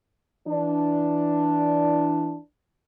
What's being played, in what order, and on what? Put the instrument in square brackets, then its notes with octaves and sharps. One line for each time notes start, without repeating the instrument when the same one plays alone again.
[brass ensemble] E3 D4